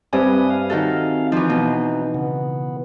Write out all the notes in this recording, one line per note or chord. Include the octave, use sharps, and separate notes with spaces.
G2 C4 B4 E5 G#5 D#6
F5
D#3 F#4 A4
E3 F3 D#4
B2
C#3 B3